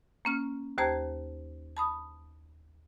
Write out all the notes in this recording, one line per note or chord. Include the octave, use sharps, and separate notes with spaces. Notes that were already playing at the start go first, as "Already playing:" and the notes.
A#3 C#4 F6
D#2 G4 C5 A5 A#5 G#6
A5 B5 D#6